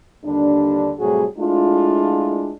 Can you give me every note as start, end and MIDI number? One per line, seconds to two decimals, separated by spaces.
0.25 0.93 39
0.25 0.93 50
0.25 0.93 55
0.25 0.93 62
0.99 1.23 45
0.99 1.23 48
0.99 1.23 54
0.99 1.23 55
0.99 1.23 66
0.99 1.23 68
1.38 2.52 56
1.38 2.52 57
1.38 2.52 62
1.38 2.52 64
1.38 2.52 65